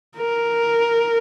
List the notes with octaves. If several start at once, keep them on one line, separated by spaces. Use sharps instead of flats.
A#4